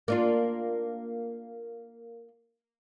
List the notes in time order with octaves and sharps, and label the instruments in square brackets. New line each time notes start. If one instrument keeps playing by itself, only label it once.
[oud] A#3 D4 F4